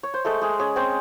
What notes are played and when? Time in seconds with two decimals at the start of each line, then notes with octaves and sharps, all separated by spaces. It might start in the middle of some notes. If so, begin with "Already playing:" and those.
0.03 C#5
0.14 C5
0.25 G#3 A3 A4
0.42 G#3 G#4
0.59 C#4 G#4
0.76 C4 C#4 C5